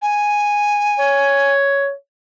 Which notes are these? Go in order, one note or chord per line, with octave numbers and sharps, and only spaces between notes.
G#5
C#5